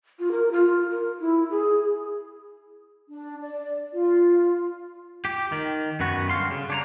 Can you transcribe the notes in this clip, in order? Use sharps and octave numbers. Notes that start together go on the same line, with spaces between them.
F4
A#4
F4
A#4
E4
G#4
D4
D5
F4
G4
D#3
F#2 B3 F#4
G2 D3 G3 F5 C6
C#3
D4 C#5 A#5